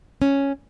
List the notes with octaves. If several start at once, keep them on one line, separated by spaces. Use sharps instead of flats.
C#4